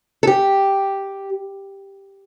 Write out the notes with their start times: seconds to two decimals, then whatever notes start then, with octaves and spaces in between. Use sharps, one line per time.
0.23 A4
0.27 G4